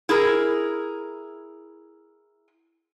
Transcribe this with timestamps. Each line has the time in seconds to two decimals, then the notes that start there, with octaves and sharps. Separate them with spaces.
0.09 E4 G#4 A#4